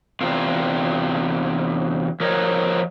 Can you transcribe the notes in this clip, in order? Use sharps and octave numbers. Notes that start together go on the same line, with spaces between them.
E2 C3 F4
F3 A#4 C#5 D#5